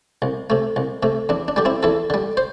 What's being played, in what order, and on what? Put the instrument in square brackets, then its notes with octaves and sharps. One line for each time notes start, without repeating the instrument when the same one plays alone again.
[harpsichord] C2
C3 A3
C2
C3 A3
E2 D4
D4
D3 G3 G4
C4 E4
E2 E4 A4
D3 G3
C5